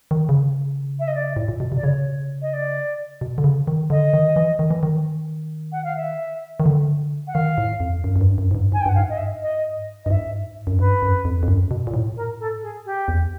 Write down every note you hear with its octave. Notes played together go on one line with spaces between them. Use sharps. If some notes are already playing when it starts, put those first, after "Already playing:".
D#3
C#3
E5
D#5
D5
A2
A#2
B2
C3 D5
C#3 C#5
D#5
D5
B2
D3
C#3
D#3
D3 D#5
D#3
E3
D#3
E3
D#3
F#5
F5
E5
D#3
D3
F#5
D#3 F5
A2
F2
F#2
F#2
G2
F#2
G#2
G2
G#2 G#5
G5
G2 F#5
F5
G#2
D#5
E5
D#5
G2 D#5
G#2 E5
F#2
G2 B4
F#2
F2
F2
F#2
B2
A#2
A2
A#4
A4
G#4
G4
E2